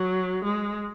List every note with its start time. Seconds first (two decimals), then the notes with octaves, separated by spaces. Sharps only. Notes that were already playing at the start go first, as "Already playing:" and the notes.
Already playing: F#3
0.45 G#3